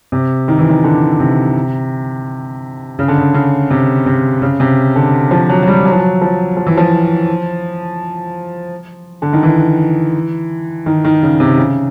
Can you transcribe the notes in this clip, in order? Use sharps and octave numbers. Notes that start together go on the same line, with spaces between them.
C3
D#3
E3
D#3
D3
C3
C#3
D3
C#3
C#3
C3
C3
C#3
C3
D3
F3
F#3
F#3
G3
F#3
F3
F#3
F3
F3
E3
F3
D3
D#3
E3
D#3
D#3
C#3
C3
C#3